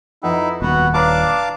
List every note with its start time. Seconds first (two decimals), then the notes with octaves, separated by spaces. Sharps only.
0.23 F2 D#4 E4 B4 F#5
0.62 D#1 B3 F#4
0.94 D4 B4 C#5 F5 A5 A#5 D6